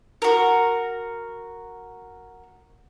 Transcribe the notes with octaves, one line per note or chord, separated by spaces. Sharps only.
F#4 A#4